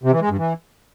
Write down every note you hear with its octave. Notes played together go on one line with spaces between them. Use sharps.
C3
E3
G#3
G2
E3